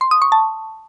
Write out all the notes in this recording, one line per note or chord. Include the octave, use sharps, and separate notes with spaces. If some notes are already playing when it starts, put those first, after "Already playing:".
C6
D#6
C#6
A5